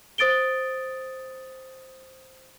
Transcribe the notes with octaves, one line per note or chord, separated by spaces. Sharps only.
C5 D#6 A6 D7 G7